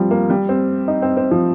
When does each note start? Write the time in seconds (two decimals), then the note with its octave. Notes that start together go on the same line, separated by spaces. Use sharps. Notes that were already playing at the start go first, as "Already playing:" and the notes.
Already playing: F3 G3 C4
0.11 A#3
0.30 G3
0.49 C4
0.88 D#4
1.02 C4
1.17 C4
1.31 F3